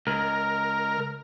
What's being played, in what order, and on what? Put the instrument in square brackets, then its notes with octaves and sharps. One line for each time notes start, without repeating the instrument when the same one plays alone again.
[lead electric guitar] C#2 [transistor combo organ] A#4